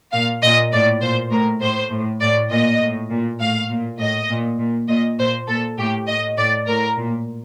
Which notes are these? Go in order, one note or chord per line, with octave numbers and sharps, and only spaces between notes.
A#2 F5
A#2 D#5
A2 D5
A#2 C5
A2 A#4
A2 C5
A2
A2 D5
A#2 D#5
A2
A#2
A2 F5
A#2
A2 D#5
A#2
A#2
A#2 D#5
A#2 C5
A#2 A4
A2 G4
A2 D#5
A2 D5
A2 A#4
A#2